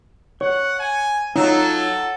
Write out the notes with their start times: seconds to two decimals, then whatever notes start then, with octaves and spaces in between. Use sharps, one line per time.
0.41 C#5 F#5
0.79 G#5
1.36 F#3 D#4 F4 A4